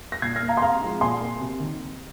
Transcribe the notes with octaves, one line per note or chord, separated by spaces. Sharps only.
A#6
A#2 G#6 C7
F6 A#6
A#3
F5 A#5
C6
C3 F5 A#5
F3 G#3 C4
A#2 G#5 C6
A#3
C3
D#3